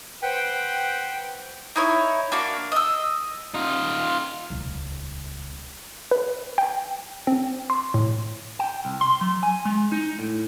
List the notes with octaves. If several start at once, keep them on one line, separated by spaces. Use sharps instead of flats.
B4 C5 F#5 G5
D#4 E4 C#5
A#3 D4 F#4 F5
D#5 E6
D#4 F4
D#1 C#2
B4
G5
C4
C6
A2
G5
C2
C6
F#3
G#5
G#3
D#4
A2